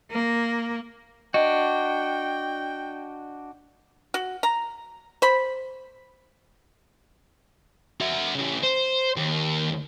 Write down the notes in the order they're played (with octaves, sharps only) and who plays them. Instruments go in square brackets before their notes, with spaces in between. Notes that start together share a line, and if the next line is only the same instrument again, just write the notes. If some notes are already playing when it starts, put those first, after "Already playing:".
[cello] A#3
[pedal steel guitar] D4 F#4 [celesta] D#5 [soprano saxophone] G5
[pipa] F#4
A#5
C5 B5
[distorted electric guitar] F#4 E5
C#3 G3
C5
D#2